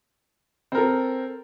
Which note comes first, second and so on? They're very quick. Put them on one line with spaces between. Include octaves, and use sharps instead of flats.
C4 A#4 A4